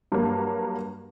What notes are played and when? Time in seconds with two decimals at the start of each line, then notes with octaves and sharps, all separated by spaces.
0.12 G2 F#3 A#3